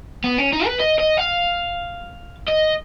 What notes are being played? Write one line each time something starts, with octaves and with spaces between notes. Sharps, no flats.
B3
C#4
D#4
B4
D#5
D#5
F5
D#5